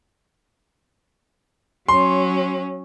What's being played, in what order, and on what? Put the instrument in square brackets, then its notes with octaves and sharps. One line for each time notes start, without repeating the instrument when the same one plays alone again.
[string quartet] F#3 C#4 [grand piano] C6